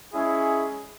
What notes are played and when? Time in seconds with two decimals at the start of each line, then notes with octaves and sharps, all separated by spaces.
0.13 G#3 C#4 E4 G#4